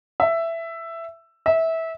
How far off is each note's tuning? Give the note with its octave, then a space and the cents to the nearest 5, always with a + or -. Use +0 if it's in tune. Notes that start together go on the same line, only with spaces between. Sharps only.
E5 +10
E5 -20